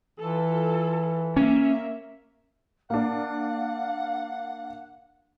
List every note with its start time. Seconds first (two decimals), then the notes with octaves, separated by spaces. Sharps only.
0.20 E3 F4 A4
1.37 A#3 C#4 E5
2.90 A#3 D4 F5 F#5